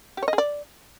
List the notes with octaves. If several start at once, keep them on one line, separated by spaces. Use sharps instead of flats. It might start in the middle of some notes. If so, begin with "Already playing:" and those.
G4
C#5
D#5
G#4
D5